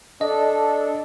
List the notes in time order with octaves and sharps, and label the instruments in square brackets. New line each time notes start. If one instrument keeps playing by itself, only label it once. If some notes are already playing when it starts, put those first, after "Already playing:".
[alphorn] D4 [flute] A4 [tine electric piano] D#5